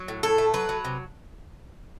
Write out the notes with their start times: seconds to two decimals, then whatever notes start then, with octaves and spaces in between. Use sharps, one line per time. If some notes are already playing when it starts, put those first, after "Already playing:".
Already playing: F#3
0.08 A2
0.23 A2 A4
0.38 A3
0.54 F#3 B4
0.69 F#3
0.85 C3